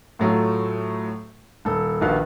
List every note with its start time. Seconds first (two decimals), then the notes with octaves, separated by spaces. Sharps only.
0.19 A2 F#3 A3 F4
1.65 D#1 A4
2.01 A#1 D#3 F#4 B4 F5